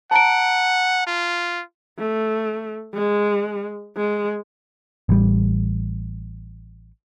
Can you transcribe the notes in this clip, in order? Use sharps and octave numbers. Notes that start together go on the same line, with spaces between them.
F#5 A5 A#5 D7
F4
A3
G#3
G#3
A1 G3